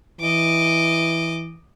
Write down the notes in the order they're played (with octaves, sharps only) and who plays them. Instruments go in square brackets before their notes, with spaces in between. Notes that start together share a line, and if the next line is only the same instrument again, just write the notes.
[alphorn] E3 [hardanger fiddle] D#5 D6